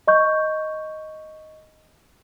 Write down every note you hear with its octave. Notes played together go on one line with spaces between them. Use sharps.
D#5 C#6 G6